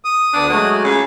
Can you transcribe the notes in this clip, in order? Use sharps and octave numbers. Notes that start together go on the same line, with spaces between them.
D#6
D2 D3 B3 D4
F#3 G#3 A3 F#4
C#3 F4